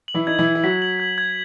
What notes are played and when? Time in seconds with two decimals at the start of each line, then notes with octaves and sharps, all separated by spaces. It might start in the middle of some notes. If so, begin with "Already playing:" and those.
0.08 F#7
0.14 E3 E4
0.27 D#4 G#6
0.39 E3 E4
0.45 G#6
0.55 E4
0.63 F#3 F#4 B6
0.82 F#7
1.00 G#6
1.18 G#6